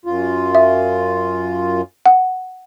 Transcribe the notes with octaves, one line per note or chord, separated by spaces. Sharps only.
F#2 F4
E5
F#5